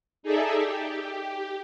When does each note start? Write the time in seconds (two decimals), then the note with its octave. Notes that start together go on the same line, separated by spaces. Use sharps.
0.23 D#4 G#4 A4 D5 E5
0.58 G4